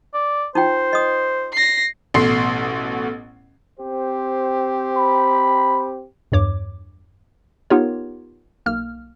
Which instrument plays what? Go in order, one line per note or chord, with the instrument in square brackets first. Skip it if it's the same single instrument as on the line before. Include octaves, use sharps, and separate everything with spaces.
[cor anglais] D5
[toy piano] D#4 F4 G5 [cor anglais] C5
[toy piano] D#5 D#6
[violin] A#6 C7
[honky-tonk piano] A1 B2 A3 C6 C7
[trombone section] C4 G4 C5
[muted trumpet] B5
[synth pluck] E2 G2 C#5 D6
B3 D#4 F4 G4 A#4 C#5
B1 A#3 F6